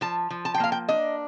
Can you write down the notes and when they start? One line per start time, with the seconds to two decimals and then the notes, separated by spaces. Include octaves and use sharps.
0.01 F3 A5
0.30 F3
0.45 A5
0.54 G5
0.60 A#3 F5
0.72 G5
0.88 D4 D#5